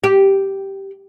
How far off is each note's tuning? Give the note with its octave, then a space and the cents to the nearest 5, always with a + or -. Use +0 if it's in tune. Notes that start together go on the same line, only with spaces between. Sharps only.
G4 -5